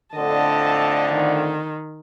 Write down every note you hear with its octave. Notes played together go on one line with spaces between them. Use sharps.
F2 A2 D3 D#5 A5
D#3